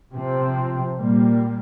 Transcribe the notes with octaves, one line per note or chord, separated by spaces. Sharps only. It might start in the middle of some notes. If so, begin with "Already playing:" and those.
C3 F3 C4
A#2 G3 A#3